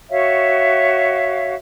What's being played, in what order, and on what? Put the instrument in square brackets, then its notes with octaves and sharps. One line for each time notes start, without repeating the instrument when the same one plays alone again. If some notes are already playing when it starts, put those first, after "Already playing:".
[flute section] F#4 C#5 E5 F5